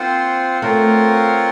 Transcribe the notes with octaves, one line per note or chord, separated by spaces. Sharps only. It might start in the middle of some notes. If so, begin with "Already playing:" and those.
Already playing: A#3 C4 F4 C5 F#5
A3 C4 F4 A#4 C#5 F#5